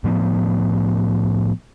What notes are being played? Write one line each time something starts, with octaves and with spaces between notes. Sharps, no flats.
A2 F3 B3